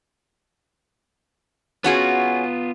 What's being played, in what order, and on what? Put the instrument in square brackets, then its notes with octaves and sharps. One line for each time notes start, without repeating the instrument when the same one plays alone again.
[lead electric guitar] B3 F4 [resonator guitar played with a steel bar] C#4 F#4 G#4